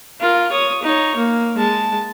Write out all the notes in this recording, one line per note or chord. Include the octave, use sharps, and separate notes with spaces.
F4 A#4
C#5 D#6
D#4 C#5
A#3
G#3 A5